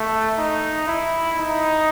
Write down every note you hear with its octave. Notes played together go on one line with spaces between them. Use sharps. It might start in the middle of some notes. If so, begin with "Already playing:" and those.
Already playing: A3
D#4
E4
D#4